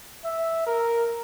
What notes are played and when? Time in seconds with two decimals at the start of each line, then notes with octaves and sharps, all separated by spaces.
0.24 E5
0.66 A#4